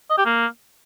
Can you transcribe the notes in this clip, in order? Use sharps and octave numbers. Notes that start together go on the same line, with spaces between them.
D#5
G4
A#3